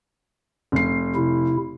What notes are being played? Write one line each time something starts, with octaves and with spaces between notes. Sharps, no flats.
F1 C7
C3 E4